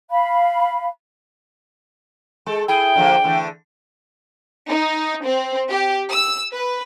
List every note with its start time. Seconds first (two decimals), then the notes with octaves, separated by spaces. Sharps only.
0.10 F5 B5
2.46 G#3 A4
2.68 E4 G#4 G5
2.96 D3 F3 A#3
3.24 D3 E3 A3
4.69 D#4
5.24 C4
5.70 G4
6.10 E6
6.53 B4